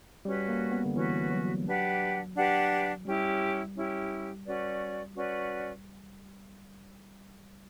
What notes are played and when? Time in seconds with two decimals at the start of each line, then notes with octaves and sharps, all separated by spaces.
0.25 G3 C#4 F#4 B4
0.49 A#3
0.72 B3
0.85 D3
0.95 E3 C#4 F#4 B4
1.30 F#3
1.66 D4 G4 B4 F#5
2.36 D4 G4 B4 F#5
3.05 G3 C#4 E4 G4
3.75 C#4 E4 G4
4.45 C#4 F#4 B4 D5
5.15 C#4 F#4 B4 D5